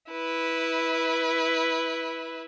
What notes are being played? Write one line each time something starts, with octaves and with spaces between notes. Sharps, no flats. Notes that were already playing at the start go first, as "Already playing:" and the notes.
E4 B4